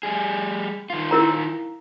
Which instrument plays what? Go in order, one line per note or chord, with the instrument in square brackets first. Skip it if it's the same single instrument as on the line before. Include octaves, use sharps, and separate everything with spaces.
[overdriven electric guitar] G3 G#4
D#3 F4
[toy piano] E4 A#4 A#5